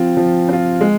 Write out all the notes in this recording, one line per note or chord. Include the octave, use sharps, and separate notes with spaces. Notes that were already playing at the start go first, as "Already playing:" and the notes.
Already playing: F3 C4 F4
F3
C4 F4
G#3